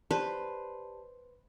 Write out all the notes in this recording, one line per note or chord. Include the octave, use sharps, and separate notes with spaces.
G4 B4 C5 D5 A5